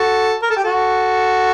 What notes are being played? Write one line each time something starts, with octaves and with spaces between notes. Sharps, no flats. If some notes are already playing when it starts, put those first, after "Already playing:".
Already playing: F#4 A4
A#4
A4
G4
F#4 A4